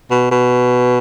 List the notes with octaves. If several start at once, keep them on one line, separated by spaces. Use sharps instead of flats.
B2
B2